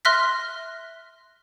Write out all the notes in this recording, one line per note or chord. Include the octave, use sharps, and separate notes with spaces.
E5 C6 F6 F#6 A#6 B6